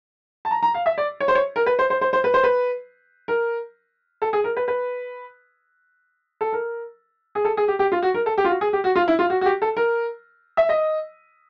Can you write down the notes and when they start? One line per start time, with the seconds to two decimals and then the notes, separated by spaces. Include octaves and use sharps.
0.45 A5
0.51 A#5
0.63 A#5
0.74 F5
0.86 E5
0.98 D5
1.20 C#5
1.28 C5
1.35 C#5
1.56 A#4
1.66 B4
1.79 C5
1.90 C5
2.01 C5
2.13 C5
2.24 B4
2.34 C5
2.43 B4
3.28 A#4
4.22 A4
4.33 G#4
4.44 A#4
4.57 B4
4.68 B4
6.41 A4
6.53 A#4
7.35 G#4
7.45 A4
7.57 G#4
7.68 G4
7.79 G4
7.92 F4
8.03 F#4
8.14 A#4
8.26 A4
8.38 G4
8.45 F4
8.49 F#4
8.61 G#4
8.73 G4
8.84 F#4
8.96 F4
9.08 E4
9.19 F4
9.30 F#4
9.41 F#4
9.46 G4
9.62 A4
9.77 A#4
10.57 E5
10.69 D#5